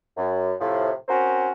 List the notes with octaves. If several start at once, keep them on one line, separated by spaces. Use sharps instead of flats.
F#2
A2 C3 F3
C4 C#4 F#4 A#4 C5